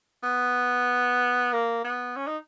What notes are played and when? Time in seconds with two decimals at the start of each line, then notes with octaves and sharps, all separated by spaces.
0.23 B3
1.53 A#3
1.84 B3
2.16 C#4
2.27 D#4